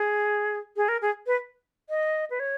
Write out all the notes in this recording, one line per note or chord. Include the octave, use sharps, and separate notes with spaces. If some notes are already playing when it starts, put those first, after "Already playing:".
Already playing: G#4
G#4
A#4
G#4
B4
D#5
B4
C#5